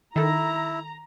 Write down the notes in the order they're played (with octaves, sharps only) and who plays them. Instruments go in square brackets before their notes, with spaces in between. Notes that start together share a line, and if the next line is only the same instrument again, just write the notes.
[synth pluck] D#3 A4 [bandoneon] E4 [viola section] A#5